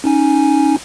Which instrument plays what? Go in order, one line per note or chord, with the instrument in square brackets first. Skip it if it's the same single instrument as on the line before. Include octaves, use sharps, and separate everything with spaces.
[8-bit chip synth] C#4 D#4 G#5